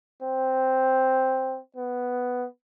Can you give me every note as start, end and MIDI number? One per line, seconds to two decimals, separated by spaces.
0.22 1.59 60
1.76 2.46 59